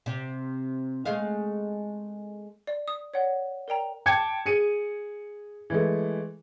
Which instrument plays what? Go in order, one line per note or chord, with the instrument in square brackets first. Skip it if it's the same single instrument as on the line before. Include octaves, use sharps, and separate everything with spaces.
[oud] C3
G#3 A3 F5
[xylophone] D5
D#6
C#5 D5 F#5
A#4 D5 G5 A#5
[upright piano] G5 A5 D6 G#6 C#7
G#4 C#7 D#7
E3 G#3 A3